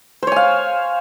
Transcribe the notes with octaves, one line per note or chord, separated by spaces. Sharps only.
C5 C#5 F5 G#5